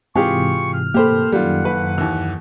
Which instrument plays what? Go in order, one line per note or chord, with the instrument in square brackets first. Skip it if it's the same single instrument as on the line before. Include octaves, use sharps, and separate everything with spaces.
[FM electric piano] G#2 C3 E3 [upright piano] F4 G4 G#4 [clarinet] C#6
[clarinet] F6
[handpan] A#3 A4 [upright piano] G4 C5 B5
[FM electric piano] F#2 D#3 [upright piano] G3 F4 [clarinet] F#5
[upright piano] F#1 B4
D#2 E3